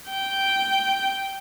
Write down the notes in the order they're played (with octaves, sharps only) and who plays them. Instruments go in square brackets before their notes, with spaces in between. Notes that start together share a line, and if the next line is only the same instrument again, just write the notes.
[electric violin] G5